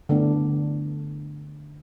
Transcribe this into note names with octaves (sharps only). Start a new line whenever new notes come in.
D3 A3 B3 D4